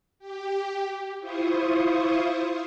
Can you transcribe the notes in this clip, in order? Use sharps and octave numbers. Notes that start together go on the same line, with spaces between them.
G4
E4 F4 C5 C#6 D#6